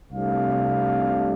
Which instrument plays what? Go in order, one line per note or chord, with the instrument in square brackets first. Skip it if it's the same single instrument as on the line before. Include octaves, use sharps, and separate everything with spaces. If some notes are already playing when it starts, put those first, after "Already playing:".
[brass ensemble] C2 C3 A3 D4 F5